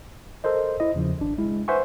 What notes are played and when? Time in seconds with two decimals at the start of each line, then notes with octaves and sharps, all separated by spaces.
0.44 A4 A#4 C5 D#5
0.80 E4 D#5
0.94 E2 C#3 F3
1.20 G#1 D4
1.38 G#3 E4
1.68 B4 C5 E5 F#5 G#5 C#6